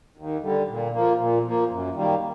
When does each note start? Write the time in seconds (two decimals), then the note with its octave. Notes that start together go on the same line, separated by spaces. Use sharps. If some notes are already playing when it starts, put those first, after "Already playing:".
0.17 D#2
0.42 D3 G3
0.68 A#2
0.93 F3 A#3
1.18 A#2
1.44 F3 A#3
1.69 F#2
1.95 D#3 G3 A#3